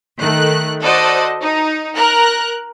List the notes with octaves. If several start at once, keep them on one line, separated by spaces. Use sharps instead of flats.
D#3 A3 F#6
F#4 A4 C5 D5 D#5
D#4
A#4 F#6